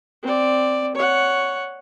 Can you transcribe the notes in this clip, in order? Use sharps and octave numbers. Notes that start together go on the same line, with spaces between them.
C4 D5
C#5 F#5